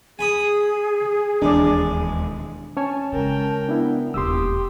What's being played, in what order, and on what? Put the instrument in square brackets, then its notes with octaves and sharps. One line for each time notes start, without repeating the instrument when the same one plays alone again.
[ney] G#4 [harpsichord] G#5 B5 D#6
[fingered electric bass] E1 D#2 E3 [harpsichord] G#3 [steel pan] D4 D5
[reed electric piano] C#4 C#5 G#5 [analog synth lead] A5
[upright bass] C#3 G#3 [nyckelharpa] A#4 G5
[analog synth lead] B3 [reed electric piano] D4 E4
[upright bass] E1 D#2 [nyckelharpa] G4 [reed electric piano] C6 E6 [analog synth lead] D#6